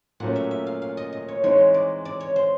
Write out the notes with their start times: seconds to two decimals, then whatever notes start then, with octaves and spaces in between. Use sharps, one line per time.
0.20 A#2 F#3 A3 C#4 F#5
0.36 E5
0.51 E5
0.67 F5
0.82 F5
0.97 D#5
1.13 D#5
1.28 C#5
1.43 E3 G#3 C4 D#4 C#5
1.74 D5
2.05 D5
2.20 C#5
2.36 C5